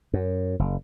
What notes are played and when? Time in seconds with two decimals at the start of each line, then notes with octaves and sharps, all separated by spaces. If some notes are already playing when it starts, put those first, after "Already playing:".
0.14 F#2
0.59 F#1